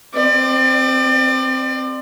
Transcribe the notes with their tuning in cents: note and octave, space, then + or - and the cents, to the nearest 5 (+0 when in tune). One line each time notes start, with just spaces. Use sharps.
C4 +0 D5 +35